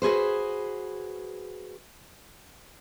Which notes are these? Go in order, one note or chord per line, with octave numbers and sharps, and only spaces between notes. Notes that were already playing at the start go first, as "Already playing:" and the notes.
F#4 G#4 B4 C5